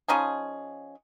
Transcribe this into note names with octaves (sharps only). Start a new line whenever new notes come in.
F3 C#4 D#4 G#4